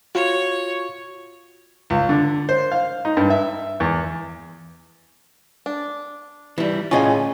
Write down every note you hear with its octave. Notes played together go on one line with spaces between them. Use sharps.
F4 F#4 C#5
C#2
D3
C5
F5
D#4
G2
E5
E2
D4
E3 G3
A2 C#3 C#4 F4 D#5 G#5